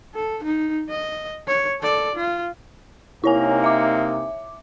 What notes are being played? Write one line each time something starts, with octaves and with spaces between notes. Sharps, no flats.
A4
D#4
D#5
C#5
A4 D5
F4
C3 A#3 D#4 E4 C#5 G#5
E5 D6